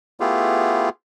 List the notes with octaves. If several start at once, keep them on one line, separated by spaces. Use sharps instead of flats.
A3 B3 E4 F4 G4 G#4